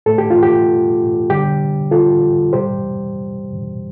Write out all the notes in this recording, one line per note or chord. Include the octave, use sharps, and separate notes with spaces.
A2 A3 A4
G4
F4
G4
D3 G3 G4
F4 A4
C3 G3 G4 C5